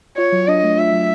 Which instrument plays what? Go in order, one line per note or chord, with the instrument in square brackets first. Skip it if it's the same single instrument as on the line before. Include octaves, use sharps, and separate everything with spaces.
[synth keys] F4 [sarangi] C#5
[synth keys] F#3
[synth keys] D4 [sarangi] D#5
[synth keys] A3
[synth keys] F4 [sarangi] E5
[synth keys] F#3